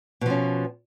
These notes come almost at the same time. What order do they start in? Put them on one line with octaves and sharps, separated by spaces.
B2 F3 C#4